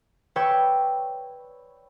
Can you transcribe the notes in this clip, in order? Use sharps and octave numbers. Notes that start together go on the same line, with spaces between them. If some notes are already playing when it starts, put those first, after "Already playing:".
B4 C#5 D5 G5 C#6 E6